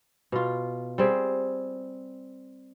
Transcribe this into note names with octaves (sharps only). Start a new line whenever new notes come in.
B2 F4
G3 C4 G#4